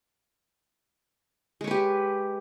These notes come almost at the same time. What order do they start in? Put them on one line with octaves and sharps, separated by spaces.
G#3 C#5 B4 G4